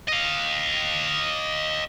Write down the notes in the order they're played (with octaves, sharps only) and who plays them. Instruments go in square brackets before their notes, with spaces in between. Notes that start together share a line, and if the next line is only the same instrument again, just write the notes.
[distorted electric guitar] D#5 F5